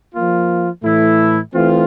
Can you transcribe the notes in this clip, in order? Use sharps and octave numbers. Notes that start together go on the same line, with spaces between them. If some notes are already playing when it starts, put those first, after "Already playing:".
F3 A#3 F4
A2 E3 A3 E4
E3 A3 C4 F4